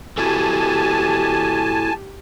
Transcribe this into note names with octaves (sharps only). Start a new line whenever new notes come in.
E4 F#4 G4 A4 G#5 A5